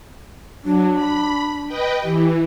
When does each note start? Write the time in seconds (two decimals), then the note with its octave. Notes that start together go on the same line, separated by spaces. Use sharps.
0.64 F#3 D4
0.94 B5
1.67 B4 D#5 G5
2.02 E3 G4